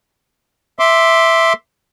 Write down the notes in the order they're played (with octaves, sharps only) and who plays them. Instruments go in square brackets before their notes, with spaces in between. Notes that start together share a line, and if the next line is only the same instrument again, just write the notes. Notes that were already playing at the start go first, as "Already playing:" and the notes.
[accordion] E5 C6 D6